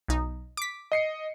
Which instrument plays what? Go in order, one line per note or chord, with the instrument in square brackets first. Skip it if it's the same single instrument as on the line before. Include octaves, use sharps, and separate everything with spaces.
[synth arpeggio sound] B1 D#4
D6 B6
[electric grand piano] D#5 C7 C#7